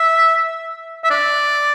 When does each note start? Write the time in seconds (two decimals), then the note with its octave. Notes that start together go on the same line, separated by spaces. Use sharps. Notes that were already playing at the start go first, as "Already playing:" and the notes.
Already playing: E5
1.04 E5
1.11 D5